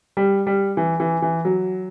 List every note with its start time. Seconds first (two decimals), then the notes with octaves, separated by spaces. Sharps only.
0.17 G3
0.47 G3
0.77 E3
1.00 E3
1.22 E3
1.45 F#3